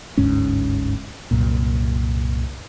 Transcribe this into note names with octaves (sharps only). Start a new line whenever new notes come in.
G1 D2 G#2 C#4
C2 F#2 A#2